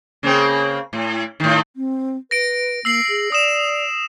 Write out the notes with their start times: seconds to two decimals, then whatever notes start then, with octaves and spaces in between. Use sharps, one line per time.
0.23 C#3 A#3 C4
0.93 A2
1.40 A2 D#3
1.76 C4
2.31 B4 A#6 D7
2.85 A#3 E6 C7 F#7
3.09 G#4
3.32 D5 D#6 E7